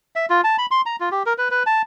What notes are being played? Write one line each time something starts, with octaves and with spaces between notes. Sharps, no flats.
E5
F4
A5
B5
C6
A#5
F4
G4
A#4
B4
B4
A5